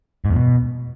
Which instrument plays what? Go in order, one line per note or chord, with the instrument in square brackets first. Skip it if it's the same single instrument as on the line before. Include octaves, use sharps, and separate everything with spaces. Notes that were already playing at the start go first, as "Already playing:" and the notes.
[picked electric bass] G#2
E2
B2